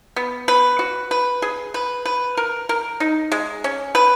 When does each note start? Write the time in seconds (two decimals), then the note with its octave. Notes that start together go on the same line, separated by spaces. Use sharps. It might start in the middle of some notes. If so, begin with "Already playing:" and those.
0.16 B3
0.48 B4
0.79 F#4
1.11 B4
1.42 G#4
1.74 B4
2.05 B4
2.37 A#4
2.69 A#4
3.00 D#4
3.32 G#3
3.64 C#4
3.95 B4